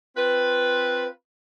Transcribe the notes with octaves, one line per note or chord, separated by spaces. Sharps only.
C4 F4 B4